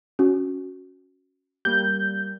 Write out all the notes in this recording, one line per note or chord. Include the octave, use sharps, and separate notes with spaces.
C#4 F#4
G3 A#3 G6